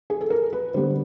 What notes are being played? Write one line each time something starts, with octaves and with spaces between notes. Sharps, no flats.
G#4
A4
A#4
B4
D3 G3 B3 C5